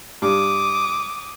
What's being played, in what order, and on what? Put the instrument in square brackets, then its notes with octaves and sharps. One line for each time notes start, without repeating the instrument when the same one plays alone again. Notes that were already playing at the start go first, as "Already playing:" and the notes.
[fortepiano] G2 [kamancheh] D6 D#6